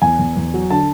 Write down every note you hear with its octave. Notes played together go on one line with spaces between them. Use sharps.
E2 G#5
E2
E2
F#3
D3 A5